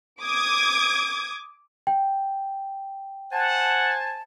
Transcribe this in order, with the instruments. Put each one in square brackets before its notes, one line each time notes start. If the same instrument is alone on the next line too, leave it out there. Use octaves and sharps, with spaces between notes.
[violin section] D6 D#6 G#6
[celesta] G5
[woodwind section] C5 G#5 A5 [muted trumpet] F#5